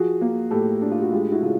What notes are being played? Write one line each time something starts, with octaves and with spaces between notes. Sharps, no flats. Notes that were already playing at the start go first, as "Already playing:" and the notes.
Already playing: F3 F#4 G#4
A#3
A2 G4 A4
D4
F4
F#4
G#3 F4 G4
E4 F#4
C#3 F4